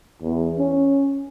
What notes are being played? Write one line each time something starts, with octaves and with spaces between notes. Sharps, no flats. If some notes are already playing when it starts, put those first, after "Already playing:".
E2
C#4